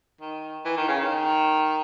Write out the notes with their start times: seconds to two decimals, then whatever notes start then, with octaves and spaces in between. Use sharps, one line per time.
0.21 D#3
0.65 E3
0.77 D#3
0.88 C#3
1.00 D#3